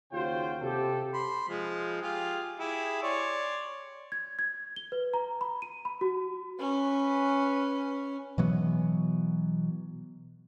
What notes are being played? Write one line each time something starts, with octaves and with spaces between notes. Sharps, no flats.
D#2 C#3 F4 F#4 C5 G5
C3 G4 A4
B5 C6
F3 G#3
F4 G4 G#4
E4 G4 G#4
C#5 D5 C6
G#6
G#6
G7
B4
A#5
B5
D#7
B5
F#4
C#4 B4
B2 E3 F#3 B3